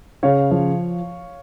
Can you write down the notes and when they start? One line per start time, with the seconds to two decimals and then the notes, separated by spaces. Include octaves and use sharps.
0.23 C#3 C#5 F5
0.51 F3